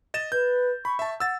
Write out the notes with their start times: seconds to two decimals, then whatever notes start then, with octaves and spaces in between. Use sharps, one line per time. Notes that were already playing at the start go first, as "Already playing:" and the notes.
0.14 D#5 A6 E7
0.32 B4 G6
0.85 B5 C#6
0.99 E5 A5
1.20 F#5 E6 A6